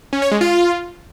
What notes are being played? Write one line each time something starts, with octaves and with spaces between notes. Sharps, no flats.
C#4
C#5
G#3
F4